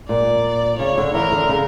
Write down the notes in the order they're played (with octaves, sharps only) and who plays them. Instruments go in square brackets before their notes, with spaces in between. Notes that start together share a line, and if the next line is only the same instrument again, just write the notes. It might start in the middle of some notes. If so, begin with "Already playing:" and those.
[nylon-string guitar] A#2 [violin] D5
[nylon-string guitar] C#3 [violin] C#5
[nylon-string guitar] D3
[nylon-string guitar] E3 [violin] A#4
[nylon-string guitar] D3
C#3